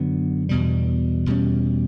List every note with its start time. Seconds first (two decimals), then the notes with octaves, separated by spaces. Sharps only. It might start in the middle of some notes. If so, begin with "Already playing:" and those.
Already playing: F#2 D3 F#3 B3
0.49 E2 B2 G3
1.26 E2 B2 G3 C#4